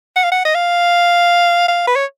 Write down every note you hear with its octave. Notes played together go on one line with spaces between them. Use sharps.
F#5
F5
F#5
D#5
F5
F5
B4
C#5